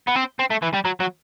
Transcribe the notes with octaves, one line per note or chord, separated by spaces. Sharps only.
B3
C4
C4
A3
E3
G3
F#3
F#3